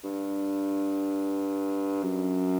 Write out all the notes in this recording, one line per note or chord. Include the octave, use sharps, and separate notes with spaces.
G2
F#2